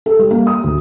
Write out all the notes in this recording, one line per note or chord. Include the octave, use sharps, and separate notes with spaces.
A4
G3
A#3
D#6
D2